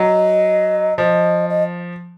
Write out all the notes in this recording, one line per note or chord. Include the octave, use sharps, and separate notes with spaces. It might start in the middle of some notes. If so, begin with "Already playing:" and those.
Already playing: F#3 D#5
F3 D#5
D#5